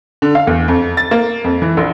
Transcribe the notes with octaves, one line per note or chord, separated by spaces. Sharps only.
D3
F5
E2
F2
A6
A#3
F2
E3
A#1